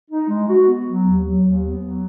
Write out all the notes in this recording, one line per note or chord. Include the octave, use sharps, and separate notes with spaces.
D#4
G#3
F#4
B3
F#3
D#2
F#3
D#2
B3
F#3